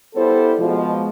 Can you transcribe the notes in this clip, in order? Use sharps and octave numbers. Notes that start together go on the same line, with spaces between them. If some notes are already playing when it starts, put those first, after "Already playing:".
G3 B3 E4 A4 C5
B2 F3 G#3